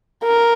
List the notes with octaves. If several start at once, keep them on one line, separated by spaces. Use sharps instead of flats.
A#4